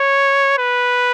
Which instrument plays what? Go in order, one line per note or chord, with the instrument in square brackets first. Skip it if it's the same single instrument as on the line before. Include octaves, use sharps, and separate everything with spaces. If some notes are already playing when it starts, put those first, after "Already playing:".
Already playing: [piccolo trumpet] C#5
B4